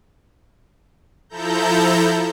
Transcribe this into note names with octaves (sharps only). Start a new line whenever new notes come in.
F3 E4 A4 A#5 G6